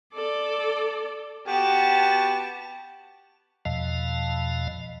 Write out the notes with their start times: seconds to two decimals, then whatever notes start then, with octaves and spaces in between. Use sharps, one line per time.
0.14 A4 D5
1.48 B3 F#4 G4 A5
3.65 E2 B2 F3 D#5 F5 A5